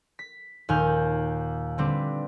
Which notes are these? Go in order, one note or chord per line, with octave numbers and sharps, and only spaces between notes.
B6
D#2 A#2 G#5 F6 G6
D3 G3 C4 D4 B4